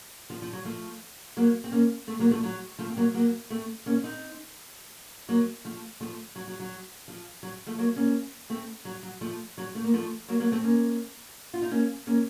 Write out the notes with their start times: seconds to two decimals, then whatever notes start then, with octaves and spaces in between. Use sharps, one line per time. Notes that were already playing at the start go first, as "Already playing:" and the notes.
0.30 F3
0.42 F3
0.53 F#3
0.65 F3 A3
1.37 F#3 A#3
1.64 C4
1.72 A#3 C#4
2.07 A3 C4
2.19 F#3 A#3
2.31 F3 A3
2.43 F#3
2.79 F3 A3
2.90 C4
2.97 F#3 A#3
3.14 F#3 A#3
3.50 A3 C4
3.86 A#3 C#4
4.03 C4 D#4
5.29 F#3 A#3
5.65 F3 A3
6.00 F3 A3
6.36 F#3
6.48 F#3
6.60 F#3
7.08 F3
7.43 F#3
7.66 F3 A3
7.78 F#3 A#3
7.96 A#3 C#4
8.50 A3 C4
8.85 F#3
9.03 F#3
9.21 F3 A3
9.58 F#3
9.75 A3
9.84 A#3
9.94 F3 A3
10.29 F#3 A#3
10.40 F#3 A#3
10.52 A3 C4
10.64 A#3 C#4
11.54 F4
11.62 D#4
11.71 A#3 C#4
12.07 A#3 C#4